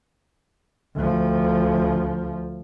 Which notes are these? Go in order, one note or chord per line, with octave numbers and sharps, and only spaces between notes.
D2 F3